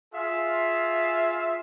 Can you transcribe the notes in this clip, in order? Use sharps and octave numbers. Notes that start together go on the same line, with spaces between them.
F4 G#4 E5 F5